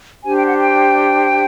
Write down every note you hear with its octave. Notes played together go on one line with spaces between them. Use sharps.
D4 G4 C5 G#5
G5
F#5
G5